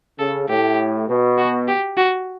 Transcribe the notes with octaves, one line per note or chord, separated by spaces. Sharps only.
C#3 A4
A2 G4
B2
F#4
G4
F#4